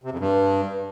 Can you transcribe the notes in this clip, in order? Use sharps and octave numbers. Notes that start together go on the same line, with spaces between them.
C3
F2
G2